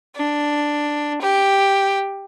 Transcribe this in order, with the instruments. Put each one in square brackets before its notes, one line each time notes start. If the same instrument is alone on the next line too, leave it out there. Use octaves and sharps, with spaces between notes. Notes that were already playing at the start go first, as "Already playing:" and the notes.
[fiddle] D4
G4